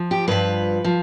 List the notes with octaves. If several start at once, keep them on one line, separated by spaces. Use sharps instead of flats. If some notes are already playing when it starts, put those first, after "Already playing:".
Already playing: F3
G4
G2 F3 B4
F3